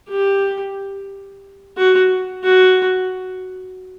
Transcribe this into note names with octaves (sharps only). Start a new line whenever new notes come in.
G4
F#4
F#4